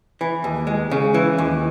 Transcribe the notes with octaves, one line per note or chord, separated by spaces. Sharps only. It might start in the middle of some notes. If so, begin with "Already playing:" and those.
E3
D#2
G#3
C#3
E3
D#2